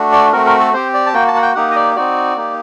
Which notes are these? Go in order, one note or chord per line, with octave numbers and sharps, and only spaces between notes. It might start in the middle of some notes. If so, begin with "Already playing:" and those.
Already playing: A3 D4 F#4
D5
A3 C4 F#4 A#4
A#4
A4
C4 G4 C5
D5
A5
A#3 F#4 G5
A5
F#5
G5
A#3 D#4 G4 F#5
D#5
D5
C4 D#4 F#4 D5
A#3 D#4 G4